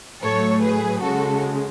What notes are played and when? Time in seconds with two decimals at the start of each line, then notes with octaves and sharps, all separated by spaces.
0.22 A2 F#3 A3 A4 C#5
0.62 G#4 B4
1.02 C#3 G#3 F#4 A4